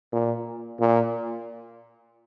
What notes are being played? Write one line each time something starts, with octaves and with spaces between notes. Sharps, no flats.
A#2
A#2